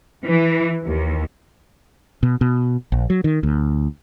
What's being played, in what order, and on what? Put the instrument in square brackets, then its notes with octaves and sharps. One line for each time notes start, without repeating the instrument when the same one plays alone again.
[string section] E3
D#2
[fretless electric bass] B2
B2
A#1
F#3
D#3
D2